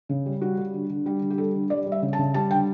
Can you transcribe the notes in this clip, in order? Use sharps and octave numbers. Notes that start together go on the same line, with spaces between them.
C#3
G3
G3 F#4
G3
D3
D3
G3 G4
D3
G4
G3 A4
D3
G3 D5
G3
E5
C#3
A5
C#3
G3 A5
D3 G5